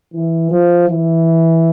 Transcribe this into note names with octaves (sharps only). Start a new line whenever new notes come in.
E3
F3
E3